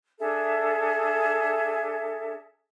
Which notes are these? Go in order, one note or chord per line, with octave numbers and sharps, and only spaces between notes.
D4 G#4 A4 E5